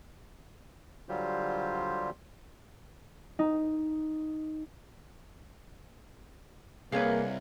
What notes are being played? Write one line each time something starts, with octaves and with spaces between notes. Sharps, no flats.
D3 F#3 G3 F4 G4 C5
D#4
C2 A#3 G#4 B4 C#5 F5